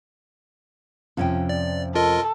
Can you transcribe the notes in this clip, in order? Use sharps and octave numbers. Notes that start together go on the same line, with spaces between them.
F2 C3 F3 C#4 G5
D5
F4 A4 A#4 D#5